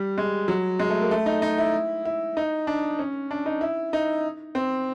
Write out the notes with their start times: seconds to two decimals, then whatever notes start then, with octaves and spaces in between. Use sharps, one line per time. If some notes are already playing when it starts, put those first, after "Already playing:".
Already playing: G3
0.18 G#3
0.48 F#3
0.80 G#3
0.90 A3
1.01 A#3
1.11 A3
1.26 D#4
1.42 D#4
1.58 E4
2.05 E4
2.37 D#4
2.67 D4
2.99 C#4
3.31 D4
3.46 D#4
3.61 E4
3.93 D#4
4.55 C4